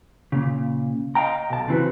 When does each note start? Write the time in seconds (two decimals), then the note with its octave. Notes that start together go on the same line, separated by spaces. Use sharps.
0.32 A#2 C#3
1.15 D#5 F5 G5 A#5
1.50 B1 A5
1.68 C#3 E3 C4 F#4 B4